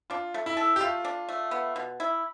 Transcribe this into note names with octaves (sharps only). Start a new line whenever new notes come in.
D4 F4
A3
E4
A4
G4
A3 F4
D4
A3
B3
B2
E4